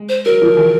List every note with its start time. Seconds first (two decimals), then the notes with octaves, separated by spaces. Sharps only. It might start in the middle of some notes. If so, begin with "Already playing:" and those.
Already playing: G#3
0.09 C5
0.25 F#3 A#4
0.42 F3
0.57 E3